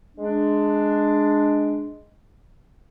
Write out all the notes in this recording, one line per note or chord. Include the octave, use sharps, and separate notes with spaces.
G#3 D4